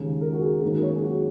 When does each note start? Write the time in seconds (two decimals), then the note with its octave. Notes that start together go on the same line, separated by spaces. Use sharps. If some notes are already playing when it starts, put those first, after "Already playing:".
Already playing: D#2 C#3 G#3 C#4
0.21 A#4
0.33 F#4
0.42 G#4
0.62 G#2 D#3 F#3 A#3 C#4 A#4
0.83 C#5
0.96 G#4
1.03 F#4